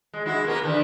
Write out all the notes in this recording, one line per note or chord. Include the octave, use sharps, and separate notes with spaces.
G#3
G#3 E4 F#4
A#3 B3 A#4
D3 E3